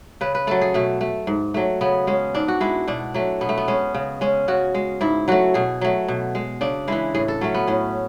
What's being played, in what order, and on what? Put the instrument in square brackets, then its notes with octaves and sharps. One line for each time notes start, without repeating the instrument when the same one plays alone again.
[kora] C#3 B4
B4
F#3 A3 A4
G#4
B2 A3
A3
G#2
F#3 A3
C#3 B3
G#3 C#4
G#2 D4
F#4
G#3 E4
B2 D4
F#3 A3
B2 B3
A3
B3
G#3 C#4
C#3
G#3 C#4
C#3 F#4
G#3
G#2 E4
F#3 A3 F#4
B2 G#4
F#3 A3
B2
G#3
C#3 D4
E3 G#3 E4
A2 G#4
A4
F#3 A3 C#4
B3
A2 C#4